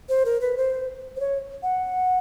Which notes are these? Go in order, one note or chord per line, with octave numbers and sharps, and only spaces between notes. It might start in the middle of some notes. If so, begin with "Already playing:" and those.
C5
A#4
B4
C5
C5
C#5
F#5